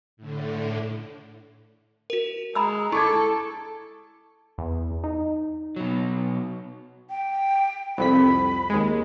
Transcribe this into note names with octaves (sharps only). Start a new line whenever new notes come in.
A2 D3
F#4 A#4
G#3 A#5 B5 E6
E4 A4 C#6 D6 G#6
E2
D#4
B2 F#3
G5
C2 F2 B5 B6
D#2 G#3